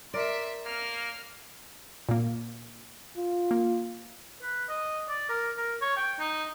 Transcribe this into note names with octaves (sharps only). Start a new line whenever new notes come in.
A#4 D5 E5 C6
A#3 F6
A#2 A#3
F4
A#3
B4
D#5
D5
A#4
A#4
C#5
G5
D#4